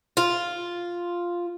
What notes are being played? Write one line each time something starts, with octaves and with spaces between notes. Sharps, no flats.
F4